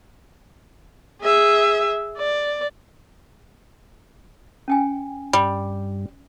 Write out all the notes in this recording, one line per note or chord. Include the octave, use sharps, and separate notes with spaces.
G#4 E5
D5
C#4 G5 G#5
G2 G3